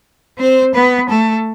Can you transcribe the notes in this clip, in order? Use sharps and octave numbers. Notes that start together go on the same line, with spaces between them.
C4 C5
B3 B4
A3 A4